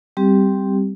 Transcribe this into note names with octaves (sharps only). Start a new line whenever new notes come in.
G3 C4 G4